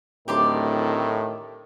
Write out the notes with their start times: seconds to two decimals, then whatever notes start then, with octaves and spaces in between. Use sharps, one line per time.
0.28 D1 A2 D#3 G4 D5 C6